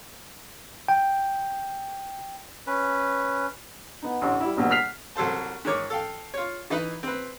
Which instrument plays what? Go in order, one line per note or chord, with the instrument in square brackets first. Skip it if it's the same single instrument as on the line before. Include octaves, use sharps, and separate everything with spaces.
[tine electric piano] G5
[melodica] C#4 B4
[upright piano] B3 D#4
A1 D2
G3 E4
D#1 A#1 E2 B2
F6 B6 C7 F7
[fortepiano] C2 F#3 A4 C5 A5
G#2 D#3 A#4 C#5 D6
A4 F5 G5
F4 C#5
E3 D#4 E4 B4
C4 B4